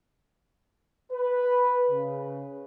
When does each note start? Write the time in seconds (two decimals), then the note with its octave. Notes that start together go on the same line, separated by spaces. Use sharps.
1.12 B4
1.90 C#3